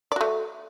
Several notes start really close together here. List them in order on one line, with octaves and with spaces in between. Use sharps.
D5 F#4 A3